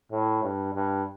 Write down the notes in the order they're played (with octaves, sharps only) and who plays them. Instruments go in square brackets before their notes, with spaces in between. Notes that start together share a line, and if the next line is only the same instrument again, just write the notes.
[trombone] A2
G2
G2